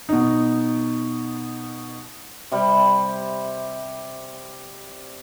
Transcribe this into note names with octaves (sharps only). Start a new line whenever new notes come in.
B2 D#4
C3 G3